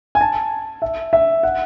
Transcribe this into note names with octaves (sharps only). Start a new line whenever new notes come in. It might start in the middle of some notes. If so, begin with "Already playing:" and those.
G#5
A5
E5
E5
F#5